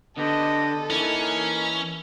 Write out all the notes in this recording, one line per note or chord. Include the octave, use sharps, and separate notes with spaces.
D3 B3 G4 A4 D#5
E3 A#3 C#4 D#4